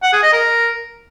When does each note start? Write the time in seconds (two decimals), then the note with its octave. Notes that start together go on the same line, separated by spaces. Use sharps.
0.03 F#5
0.13 G#4
0.23 D#5
0.33 A#4